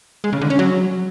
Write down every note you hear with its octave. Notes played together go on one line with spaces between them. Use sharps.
G#3
C#3
D3
C#4
F#3